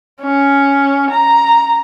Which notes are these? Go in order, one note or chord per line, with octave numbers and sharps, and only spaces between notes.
C#4
A#5